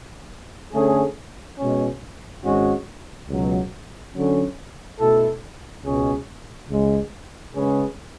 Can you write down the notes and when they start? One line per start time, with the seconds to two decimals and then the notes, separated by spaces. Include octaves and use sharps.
0.73 D3 A3 C#4 G#4
1.58 B2 G#3 C#4
2.43 G#1 G#2 G#3 C#4 F#4
3.28 C#2 B2 F#3
4.14 D3 F#3 C#4
4.99 B2 A3 E4 A4
5.84 C#2 B2 G#3 C#4 G#4
6.70 C#2 C#3 G#3
7.54 C#3 G#3 C#4 G#4 B4